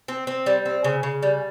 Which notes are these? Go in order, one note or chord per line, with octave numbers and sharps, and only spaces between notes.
C4
C4
G3
C4
C#3
C#3
G3